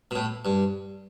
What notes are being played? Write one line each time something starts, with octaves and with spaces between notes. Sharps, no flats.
B2
A2
G2